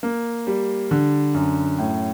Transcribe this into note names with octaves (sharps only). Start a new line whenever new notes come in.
A#3
G3
D3
F#2
A2